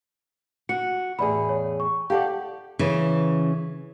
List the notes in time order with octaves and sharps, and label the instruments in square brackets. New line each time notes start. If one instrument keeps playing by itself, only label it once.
[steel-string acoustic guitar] F#4 [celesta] C#7
[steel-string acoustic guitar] E2 A2 G#4 [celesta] D5 B5
[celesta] C#5
C#6
[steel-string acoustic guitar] G4 A4 D5 [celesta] F5 F#5
[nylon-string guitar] C#3 E3